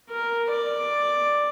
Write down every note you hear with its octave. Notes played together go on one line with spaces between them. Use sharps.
A#4
D5